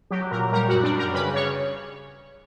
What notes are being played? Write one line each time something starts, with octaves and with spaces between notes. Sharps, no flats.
F#3 G4
A#2 A#4
G3 A#4
F#4
F#2
D4
G3 A#4
C#3 B4
C#3 C#5